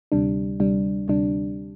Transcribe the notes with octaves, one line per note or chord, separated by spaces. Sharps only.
D2 C3 G3 D4
D2 C3 G3 D4
D2 C3 G3 D4